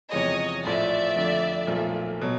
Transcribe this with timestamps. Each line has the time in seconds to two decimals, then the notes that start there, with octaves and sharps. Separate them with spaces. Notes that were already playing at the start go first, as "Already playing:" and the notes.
0.12 E2 C3 F3 G#3 C#5 D#5
0.63 A#1 A2 F3 D5 E5
1.16 F2 D3 F3 A3
1.67 B1 A#2 F3 A3
2.21 B2 F#3